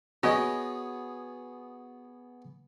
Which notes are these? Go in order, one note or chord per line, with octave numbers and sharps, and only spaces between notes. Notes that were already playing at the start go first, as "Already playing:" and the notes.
B3 F#4 G#4 C#5 D#5